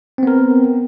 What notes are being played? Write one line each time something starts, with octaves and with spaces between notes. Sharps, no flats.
B3 C4 A#4